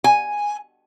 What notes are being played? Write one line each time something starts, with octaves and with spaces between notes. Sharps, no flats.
G#5